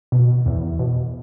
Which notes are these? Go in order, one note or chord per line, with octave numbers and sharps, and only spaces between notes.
B2
E2
B2